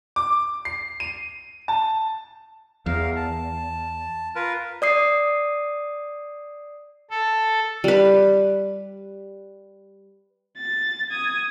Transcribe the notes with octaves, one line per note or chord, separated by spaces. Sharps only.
D6
C7
D#7
A5
E2 A#4 F5
A5
F4 A#4 B4
D5 D#6 C7
A4
G3 B4
A6
D#6 G#6